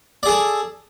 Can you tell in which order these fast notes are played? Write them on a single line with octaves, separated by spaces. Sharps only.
D5 G#4 A4